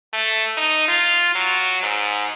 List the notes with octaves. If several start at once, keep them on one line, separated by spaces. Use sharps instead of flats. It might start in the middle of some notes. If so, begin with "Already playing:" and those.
A3
D#4
F4
F#3
G#2